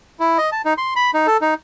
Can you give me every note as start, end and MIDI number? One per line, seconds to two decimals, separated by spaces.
0.20 0.38 64
0.38 0.50 75
0.52 0.62 81
0.65 0.74 63
0.78 0.94 84
0.96 1.11 83
1.14 1.27 63
1.27 1.37 69
1.41 1.54 63